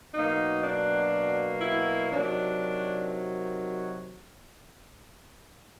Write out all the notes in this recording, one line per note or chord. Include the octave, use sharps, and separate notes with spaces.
B2 F#3 A#3 D#4
D4
E4
C3 D#3 F#3 D4